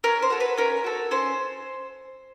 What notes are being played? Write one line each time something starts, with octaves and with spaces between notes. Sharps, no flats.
C#4 A#4
C5
F#4 A4
B4
C#4 A#4
F#4 A4
C#4 C5